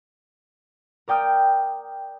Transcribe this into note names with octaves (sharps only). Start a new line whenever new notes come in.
A#4 D5 G5 D#6 F6